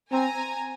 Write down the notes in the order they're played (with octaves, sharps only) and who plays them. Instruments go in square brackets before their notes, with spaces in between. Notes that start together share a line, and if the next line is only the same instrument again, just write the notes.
[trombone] C4 [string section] G#5 A#5